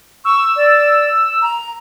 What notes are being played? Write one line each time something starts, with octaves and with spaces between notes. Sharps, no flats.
C#6 E6
D5
A#5